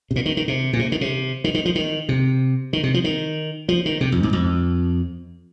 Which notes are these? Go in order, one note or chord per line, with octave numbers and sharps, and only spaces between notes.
C3
A#2
D#3
D#3
C3
A#2
C3
D#3
C3
D#3
D#3
F3
D#3
C3
D#3
C3
F3
D#3
F3
D#3
C3
F2
G#2
F2